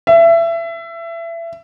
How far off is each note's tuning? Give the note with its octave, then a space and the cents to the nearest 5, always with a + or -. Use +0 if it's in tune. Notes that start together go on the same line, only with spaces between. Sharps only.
E5 +25